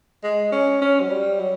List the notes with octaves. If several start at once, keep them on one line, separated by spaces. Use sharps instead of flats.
G#3
C#4
C#4
F#3
G3
F#3